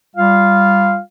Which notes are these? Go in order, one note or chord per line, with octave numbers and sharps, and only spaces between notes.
G3 F4 F5